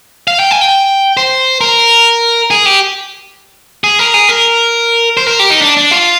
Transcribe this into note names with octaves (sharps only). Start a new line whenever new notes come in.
F5
G5
G#5
G5
C5
A#4
G#4
G4
G#4
A#4
G#4
A#4
C5
A#4
G4
D#4
D4
D4
F4